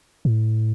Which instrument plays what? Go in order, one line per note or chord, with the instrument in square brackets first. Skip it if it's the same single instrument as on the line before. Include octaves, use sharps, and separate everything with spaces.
[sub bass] A2